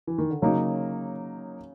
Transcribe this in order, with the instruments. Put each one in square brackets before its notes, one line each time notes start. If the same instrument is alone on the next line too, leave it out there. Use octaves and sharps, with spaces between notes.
[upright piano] E3
D#3
D3
[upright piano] C#3 [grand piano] F#3 A#3 D#4